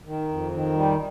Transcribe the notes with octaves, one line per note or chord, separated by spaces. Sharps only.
D#3
F2
D#3
G3